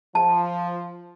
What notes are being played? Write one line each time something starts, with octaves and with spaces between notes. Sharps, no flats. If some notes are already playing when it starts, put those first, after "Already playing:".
F3 A5